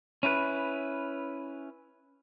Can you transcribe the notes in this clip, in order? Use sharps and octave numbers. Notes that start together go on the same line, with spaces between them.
C#4 E4 B4